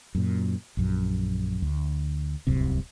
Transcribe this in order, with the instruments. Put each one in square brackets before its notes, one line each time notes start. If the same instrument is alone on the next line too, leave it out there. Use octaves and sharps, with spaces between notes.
[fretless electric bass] F#2 A#2
A#1 F#2
D2
D1 C2 F#2 C3